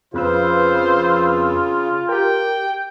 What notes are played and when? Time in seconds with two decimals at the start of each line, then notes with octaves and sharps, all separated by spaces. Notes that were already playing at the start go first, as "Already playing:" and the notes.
0.14 F2 C#3 F4 B4 C5 E6
2.09 G4 A#4 G5